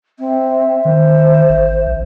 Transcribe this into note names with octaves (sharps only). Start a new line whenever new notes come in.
C4 E5
D#3 C5
G#1
A#1